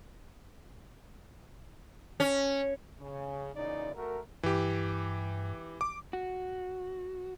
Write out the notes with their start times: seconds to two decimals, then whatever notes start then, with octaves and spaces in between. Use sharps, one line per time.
2.20 C#4
3.00 C#3
3.56 A#2 C#3 E3 D#4 D5
3.94 A3 F#4 A#4
4.43 G2 E3 G4
5.81 D6
6.13 F#4